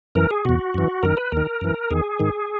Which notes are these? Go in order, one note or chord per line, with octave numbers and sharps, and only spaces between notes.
F#2 E3 A#4
G#4
E2 B2 F#4
F#2 E3
F#2 D#3 A#4
B4
D#2 D#3 A#4
F#2 E3
E2 D#3 G#4
G#2 D#3